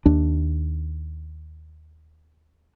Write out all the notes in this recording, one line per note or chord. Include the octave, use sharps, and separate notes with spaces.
D#2 D4